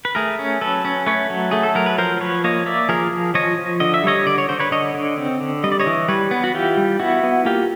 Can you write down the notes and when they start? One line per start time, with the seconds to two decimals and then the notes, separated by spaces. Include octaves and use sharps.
0.05 B4
0.15 A3 G#4 A#4
0.39 C#4
0.61 F#3 A4 B4
0.85 C#4
1.06 A3 B4 C#5
1.30 F#3
1.51 A3 G#4
1.63 A4
1.75 F#3 A#4
1.86 B4
1.98 F3 A#4 C5
2.20 F3 B4 C#5
2.44 A#3 C#5 D#5
2.66 A#3 D5 E5
2.89 F3 G#4 A#4
3.12 F3
3.34 F3 C#5 D#5
3.58 F3
3.80 D3 D#5
3.94 E5
4.04 G3 C#5 D#5
4.27 D3 D5
4.38 C#5
4.49 D3 C5
4.60 B4 C#5
4.71 D3 C#5 D#5
4.94 D3
5.18 C4
5.41 D3
5.64 G3 D#5
5.72 D5
5.80 C#5 D#5
5.86 E3
6.08 G3 B4 C#5
6.31 B3
6.44 F#4
6.54 E3 F4 G4
6.77 G3
7.00 B3 E4 F#4
7.23 B3
7.45 A#3 F4 G4